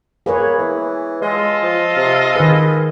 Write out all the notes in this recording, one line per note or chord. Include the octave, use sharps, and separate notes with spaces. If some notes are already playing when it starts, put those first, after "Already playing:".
A#3 G#4 B4 C#5
E3
G#3 F4 A4 D#5
F3
C3
D#3 G#4 B4